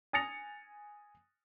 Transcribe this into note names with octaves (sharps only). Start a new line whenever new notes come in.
G#5 D#6 A6 A#6 C#7 F7